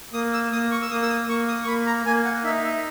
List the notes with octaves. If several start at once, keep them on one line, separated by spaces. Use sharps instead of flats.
A#3 D#6
E6
A#3 D#6
C#6
E6
A#3 D#6
E6
D#6
A#3 C#6
D#6
C#6
A#3 B5
A#5
A#3 G#5
F#5
D#4 E5
E5